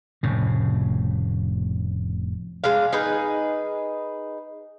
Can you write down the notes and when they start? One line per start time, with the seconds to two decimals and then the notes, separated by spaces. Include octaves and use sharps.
0.23 F1 A2 C#3
2.64 G#3 D4 F5
2.93 D#4 G#4 B4